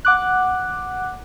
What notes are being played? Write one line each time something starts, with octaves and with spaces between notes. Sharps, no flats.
F#5 D6 F#6